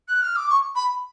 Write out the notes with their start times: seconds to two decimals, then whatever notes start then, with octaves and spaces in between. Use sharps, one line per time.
0.08 F#6
0.22 F6
0.36 D6
0.50 C#6
0.76 B5